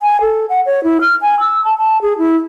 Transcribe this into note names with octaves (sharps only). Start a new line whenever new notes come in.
G#5
A4
F#5
C#5
E4
F6
G#5
E6
A5
A5
G#4
E4